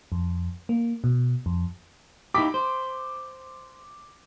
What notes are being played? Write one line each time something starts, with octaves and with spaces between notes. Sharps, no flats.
F2
A#3
B2
F2
D#4 E4 G4 D6 B6
C5